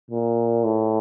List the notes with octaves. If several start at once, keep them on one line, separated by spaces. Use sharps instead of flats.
A#2
A2